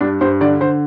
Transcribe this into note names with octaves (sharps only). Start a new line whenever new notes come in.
G2 D4
G2 C5
D3 D5
D3 C5